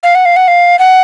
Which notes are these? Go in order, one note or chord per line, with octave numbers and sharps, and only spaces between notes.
F5
F#5
F5
F#5
F5
F#5